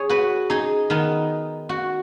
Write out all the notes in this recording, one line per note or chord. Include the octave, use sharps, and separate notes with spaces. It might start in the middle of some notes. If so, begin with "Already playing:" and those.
Already playing: G#4 C#5
F#4 B4
D#4 G#4
D#3 B3 D#4
F#4